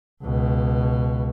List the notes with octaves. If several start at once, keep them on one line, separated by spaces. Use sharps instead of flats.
C#2 B2